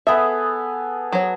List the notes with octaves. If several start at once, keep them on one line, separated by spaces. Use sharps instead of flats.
B3 G#4 A4 E5
F#3 C#5